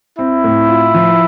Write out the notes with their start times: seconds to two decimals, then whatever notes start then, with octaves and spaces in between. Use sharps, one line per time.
0.19 C4 E4
0.44 A2
0.69 F4
0.94 F3